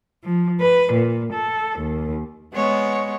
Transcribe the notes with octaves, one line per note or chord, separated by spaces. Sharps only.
F3
B4
A#2
A4
D#2
G#3 B3 C#5